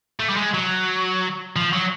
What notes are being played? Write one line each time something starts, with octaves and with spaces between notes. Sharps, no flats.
A3
G3
G#3
F#3
F3
F#3